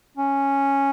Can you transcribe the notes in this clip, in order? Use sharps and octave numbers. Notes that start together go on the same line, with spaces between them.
C#4